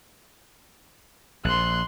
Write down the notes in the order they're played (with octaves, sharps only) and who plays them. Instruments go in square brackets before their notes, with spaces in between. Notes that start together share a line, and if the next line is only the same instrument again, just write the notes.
[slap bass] A#1 [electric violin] C6 F#6